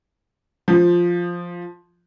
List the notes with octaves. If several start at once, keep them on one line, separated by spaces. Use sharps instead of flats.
F3